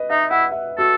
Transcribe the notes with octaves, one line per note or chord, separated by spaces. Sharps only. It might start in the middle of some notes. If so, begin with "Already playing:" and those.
Already playing: B4 D#5
D#4 E5
E4 F#5
E5
F#4 A4